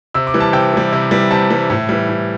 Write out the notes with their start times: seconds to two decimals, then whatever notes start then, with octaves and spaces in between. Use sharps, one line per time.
0.14 C3 E6
0.27 D6
0.34 E3 G3
0.40 A5
0.53 C3 G5
0.73 E3 G3
0.93 C3
1.11 E3 G3
1.31 C3 A5
1.50 E3 G3
1.70 A2
1.89 E3 G3
2.09 A2